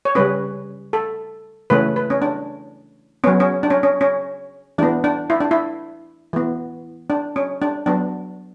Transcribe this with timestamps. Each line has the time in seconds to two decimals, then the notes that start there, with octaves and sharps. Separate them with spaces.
0.05 C#5
0.15 C#3 G3 C#4 B4
0.93 A4
1.70 C#3 E3 A3 C#4 B4
1.96 B4
2.10 C#4
2.22 D4
3.24 F#3 B3 C#4
3.40 C#4
3.63 D4
3.70 C#4
3.83 C#4
4.01 C#4
4.78 E3 B3 D4
5.04 D4
5.30 E4
5.40 D4
5.51 E4
6.33 E3 B3
7.10 D4
7.36 C#4
7.62 D4
7.86 F#3 B3 D4